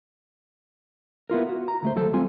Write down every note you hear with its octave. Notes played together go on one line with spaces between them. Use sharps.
B3 E4 F4 A#4
F#4
A#5
D2 A3 C5
D#2 F#3 A4 C5 A5
G3 G#3 C4 F4 G#5